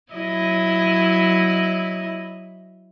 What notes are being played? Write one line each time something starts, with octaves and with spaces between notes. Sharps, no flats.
F#3 E4 D#5